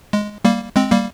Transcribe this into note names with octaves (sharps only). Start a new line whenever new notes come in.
G#3
G3 A#3
G#3 C4
G3 A#3